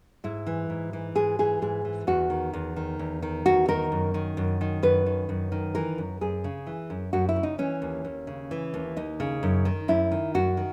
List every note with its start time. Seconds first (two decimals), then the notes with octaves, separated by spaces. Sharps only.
0.24 G#2 E4
0.47 E3
0.70 G#2
0.93 E3
1.15 G#2 G#4
1.39 E3 G#4
1.62 G#2 G#4
1.85 E3
2.07 E2 F#4
2.30 D#3
2.53 E2
2.76 D#3
2.99 E2
3.22 D#3
3.46 E2 F#4
3.68 D#3 A#4
3.92 F#2
4.14 D#3
4.37 F#2
4.61 D#3
4.83 F#2 B4
5.06 D#3
5.29 F#2
5.52 D#3
5.75 E3 A#4
5.98 F#2
6.21 F#2 G#4
6.44 C#3
6.67 E3
6.90 F#2
7.13 F#2 F#4
7.29 E4
7.36 C#3
7.43 D#4
7.58 E3 C#4
7.82 D#2
8.05 D#2
8.27 C#3
8.51 E3
8.74 D#2
8.97 D#2 D#4
9.20 C#3
9.43 F#2
9.65 D#3
9.88 F#2 E4
10.12 D#3
10.35 F#2 F#4
10.57 D#3